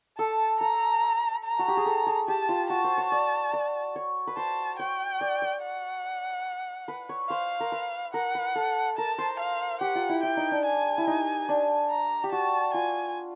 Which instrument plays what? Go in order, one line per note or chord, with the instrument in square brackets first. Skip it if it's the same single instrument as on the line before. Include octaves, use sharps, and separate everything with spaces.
[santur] A4 [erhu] A5
[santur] A4 [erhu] A#5
[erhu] A#5
[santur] F#4
G4
G#4
A4
G#4
[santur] G4 [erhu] A5
[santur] F4
[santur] F#4 [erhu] A5
[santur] C5
C#5
D5
D5
C#5
B4
[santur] C5 [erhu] A5
[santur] C#5 [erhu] G5
[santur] D5
C#5
[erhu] F#5
[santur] B4
C#5
[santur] C5 [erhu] F5
[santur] A#4
B4
[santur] A#4 [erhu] F#5
[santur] B4
A4
[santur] A#4 [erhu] A5
[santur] C5
[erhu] F5
[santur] G4 [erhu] F#5
[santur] F4
E4
[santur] E4 [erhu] G5
[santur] D#4
D4
[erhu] G#5
[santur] E4
D#4
D4
[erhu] A#5
[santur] G4
[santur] F#4 [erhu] A5
[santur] F4 [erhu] G#5